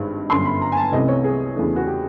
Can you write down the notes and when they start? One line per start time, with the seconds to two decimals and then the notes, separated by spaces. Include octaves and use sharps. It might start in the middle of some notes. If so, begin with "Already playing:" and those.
Already playing: G#1 G2 D#3 G#3
0.30 G1 F#2 D3 C6
0.45 B5
0.61 A#5
0.72 G#5
0.77 A5
0.92 C2 C3 E3 A3 C#4 D#5
1.08 C#5
1.24 G#4
1.56 E2 C#3 E3 A3 D4
1.76 F#4
1.87 G4